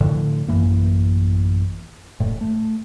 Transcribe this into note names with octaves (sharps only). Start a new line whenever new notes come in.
A2 D3 F3
A1 F#2 E3 A#3
D#1 A2
A3